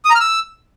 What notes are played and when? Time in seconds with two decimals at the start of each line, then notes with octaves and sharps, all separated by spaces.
0.05 D#6
0.10 A#5
0.15 F6
0.20 E6